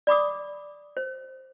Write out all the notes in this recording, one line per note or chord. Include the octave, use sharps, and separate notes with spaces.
D5 B5 D6 D#6
C5